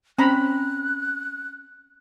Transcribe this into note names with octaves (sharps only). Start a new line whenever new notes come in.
C4 C#4 A#5 B5 F#6